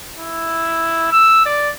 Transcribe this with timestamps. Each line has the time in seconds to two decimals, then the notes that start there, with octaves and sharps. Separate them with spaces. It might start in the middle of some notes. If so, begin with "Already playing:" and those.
0.18 E4
1.12 E6
1.45 D5